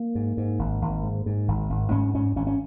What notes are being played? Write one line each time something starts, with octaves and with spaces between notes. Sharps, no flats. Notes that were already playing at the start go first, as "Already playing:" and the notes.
Already playing: A#3
G#2
G#2
G#1
G#1
G#2
G#2
G#1
G#1
G#2 C#4
G#2 C#4
G#1 C#4
C#4